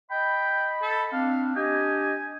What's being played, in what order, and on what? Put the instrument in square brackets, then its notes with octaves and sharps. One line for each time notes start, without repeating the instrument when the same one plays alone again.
[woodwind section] D#5 B5 [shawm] G5
[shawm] A4
[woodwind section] C4 D4 [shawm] F5
[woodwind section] D4 G4 D#5 [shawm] G#5